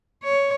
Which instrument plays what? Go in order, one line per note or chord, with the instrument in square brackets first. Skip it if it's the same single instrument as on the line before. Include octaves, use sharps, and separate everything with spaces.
[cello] C#5